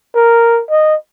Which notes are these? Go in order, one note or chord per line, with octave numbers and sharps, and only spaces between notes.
A#4
D#5